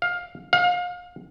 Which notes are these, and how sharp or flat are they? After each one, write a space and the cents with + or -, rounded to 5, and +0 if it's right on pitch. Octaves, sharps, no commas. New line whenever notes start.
F5 +15
F5 +30